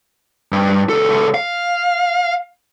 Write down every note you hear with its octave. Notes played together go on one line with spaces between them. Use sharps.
G2
C#2 A4
F5